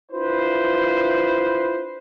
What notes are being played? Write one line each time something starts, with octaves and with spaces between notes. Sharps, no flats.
D4 E4 F4 B4 C5